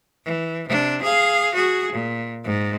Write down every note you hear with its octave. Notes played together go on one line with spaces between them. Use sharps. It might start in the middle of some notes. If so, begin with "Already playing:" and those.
E3
C3 D4
G#4 F5
F#4 G#4
A#2
G#2